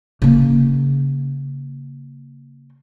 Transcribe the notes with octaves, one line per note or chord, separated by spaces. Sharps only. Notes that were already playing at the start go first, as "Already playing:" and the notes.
C#3 A#3